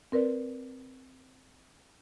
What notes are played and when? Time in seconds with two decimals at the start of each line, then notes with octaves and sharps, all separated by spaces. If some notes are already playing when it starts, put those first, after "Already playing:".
0.12 C4 A#4 B4 D5